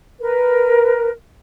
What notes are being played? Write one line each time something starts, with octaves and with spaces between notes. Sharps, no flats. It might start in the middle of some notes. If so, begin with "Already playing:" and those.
A#4 B4